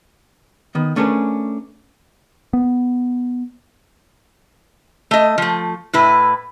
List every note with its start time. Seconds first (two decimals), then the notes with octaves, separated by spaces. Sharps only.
0.75 D#3 B3
0.96 A3 C#4 D4 G#4 A#4 B4
2.53 B3
5.11 A3 D#5
5.38 F3 A3
5.93 A2 E4 B4